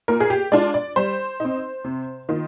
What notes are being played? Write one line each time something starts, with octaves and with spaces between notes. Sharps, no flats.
A#2 A#4
G#4
G4
G#3 D4 F4 D5
D5
G3 C5
C4 D#4
C3
D#3 A#3 F4